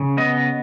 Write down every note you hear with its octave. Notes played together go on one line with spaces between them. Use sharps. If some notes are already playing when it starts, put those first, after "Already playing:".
Already playing: C#3
B3 D#5